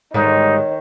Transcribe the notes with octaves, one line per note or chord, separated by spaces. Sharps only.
G#2 D3 D#3 G3 D#4 C#5